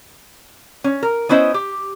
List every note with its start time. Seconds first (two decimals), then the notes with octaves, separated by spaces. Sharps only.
0.84 C#4
1.03 A#4
1.29 B3 C#4 E4 C5 D#5
1.54 G4